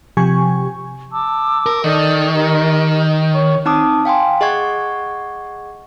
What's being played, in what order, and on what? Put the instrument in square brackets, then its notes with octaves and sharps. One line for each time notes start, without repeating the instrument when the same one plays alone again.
[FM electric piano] C3 F3 G4 G#5 C#6
[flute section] A5 D6 E6
[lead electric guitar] A#4
[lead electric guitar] D#3 [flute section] A4 D5
[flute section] G4 A#4 D#5
C#5 C#6
[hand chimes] C4 D#4 A5 D6 D#6
F5 G5 G#5 C6
G#4 D#5 F#5 C#6 G#6